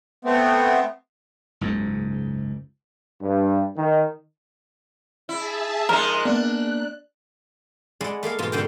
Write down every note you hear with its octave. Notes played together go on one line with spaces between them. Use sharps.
A3 B3 C4
F#1 C#2 G#2
G2
D#3
E4 G#4 E5 A5
F3 G#3 D#4 A#4 F#6
A#3 B3 D4
G#3 E4 G#4 D5 F#5
A3 A#3 G#4 F5
G#2 B2 E3 A#3 F4
F2 G#2 D3 C5 F#5 G5